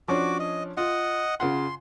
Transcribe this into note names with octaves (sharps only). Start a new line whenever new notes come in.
F3 C#4 D4 F#4 D6
D#5
F4 D#5 F#5
C#3 F4 F#5 C6